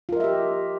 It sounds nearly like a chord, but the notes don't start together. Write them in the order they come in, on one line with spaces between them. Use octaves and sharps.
F4 A#4 D#5 E5 G4